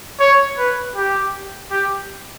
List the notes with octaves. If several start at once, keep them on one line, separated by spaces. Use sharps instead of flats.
C#5
B4
G4
G4